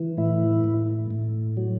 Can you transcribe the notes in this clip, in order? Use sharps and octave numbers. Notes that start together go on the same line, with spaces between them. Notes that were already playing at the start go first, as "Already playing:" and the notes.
Already playing: E3
A2 E4
A2
A2
F#3